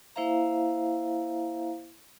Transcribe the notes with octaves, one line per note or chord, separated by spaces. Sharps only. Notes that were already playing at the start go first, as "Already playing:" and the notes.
A#3 E4 C5 E5 F5 A#5